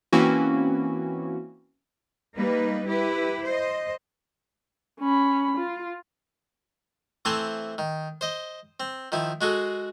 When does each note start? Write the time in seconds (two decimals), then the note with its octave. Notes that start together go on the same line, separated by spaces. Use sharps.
0.12 E3 A#3 C4 C#4 E4 F#4
2.35 G3 A#3 D#4 B4
2.88 E4 G4 B4
3.44 C5 D#5
5.00 C#4 B5
5.57 F4
7.25 E3 A3 C4 C5 G#5 A5
7.78 D#3
8.21 C5 D#5
8.80 C4
9.12 D#3 F3 E4
9.41 G#3 F#4 G#4 A4